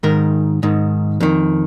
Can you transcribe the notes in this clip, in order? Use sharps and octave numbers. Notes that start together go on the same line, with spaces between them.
G#2 D#3 A#4
G#2 D#3
F2 D#3